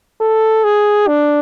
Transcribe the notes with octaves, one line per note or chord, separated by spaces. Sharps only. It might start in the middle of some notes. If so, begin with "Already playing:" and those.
A4
G#4
D4